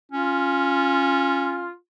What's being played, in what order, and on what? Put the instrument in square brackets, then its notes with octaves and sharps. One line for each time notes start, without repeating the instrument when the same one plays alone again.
[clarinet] C#4 [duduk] F4